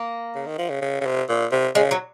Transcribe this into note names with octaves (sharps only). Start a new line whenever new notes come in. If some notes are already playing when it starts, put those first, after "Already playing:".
Already playing: A#3
C#3
D#3
F3
C#3
C#3
C#3
C3
A#2
C3
C#3 G#3
F#3